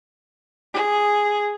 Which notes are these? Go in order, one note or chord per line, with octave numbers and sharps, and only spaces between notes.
G#4